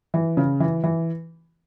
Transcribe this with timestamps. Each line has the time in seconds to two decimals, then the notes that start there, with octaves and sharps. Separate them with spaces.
0.14 E3
0.37 C#3
0.60 E3
0.84 E3